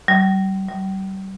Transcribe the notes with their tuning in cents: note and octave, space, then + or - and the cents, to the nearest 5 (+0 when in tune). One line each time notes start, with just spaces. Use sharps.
G3 -35
G3 -35